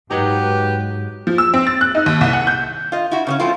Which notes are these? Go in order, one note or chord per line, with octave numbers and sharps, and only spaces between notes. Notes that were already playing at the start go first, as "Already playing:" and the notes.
G#2 F#3 D#4 G4 B4
F3
E6
C4
A6
F#6
D#4
D#2
C2
F#5
G6
F4 D#5
E4 F#4
C#3 B3 C#4
F3 A3 C4 E4 F4